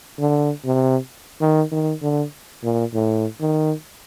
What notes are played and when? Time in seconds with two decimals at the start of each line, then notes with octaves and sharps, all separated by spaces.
0.19 D3
0.65 C3
1.41 D#3
1.72 D#3
2.02 D3
2.63 A#2
2.94 A2
3.40 D#3